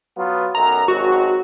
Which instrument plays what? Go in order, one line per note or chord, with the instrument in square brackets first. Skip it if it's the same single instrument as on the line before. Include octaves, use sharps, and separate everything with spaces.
[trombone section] F#3 B3 F4
[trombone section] B1 F#2 [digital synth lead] A#5
[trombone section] G#1 D#3 F#3 [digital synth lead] F#4